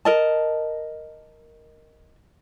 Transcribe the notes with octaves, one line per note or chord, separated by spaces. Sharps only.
A#4 D#5 A5